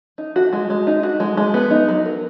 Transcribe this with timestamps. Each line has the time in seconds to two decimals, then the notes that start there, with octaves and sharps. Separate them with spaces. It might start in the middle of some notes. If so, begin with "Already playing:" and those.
0.18 D#4
0.36 F#4
0.53 G#3
0.70 G#3
0.87 D#4
1.03 F#4
1.20 G#3
1.37 G#3
1.54 B3
1.71 D#4
1.88 F#3
2.06 A#4